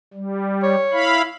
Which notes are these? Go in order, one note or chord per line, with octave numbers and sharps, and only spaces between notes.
G3
C#5
E4 F5 B5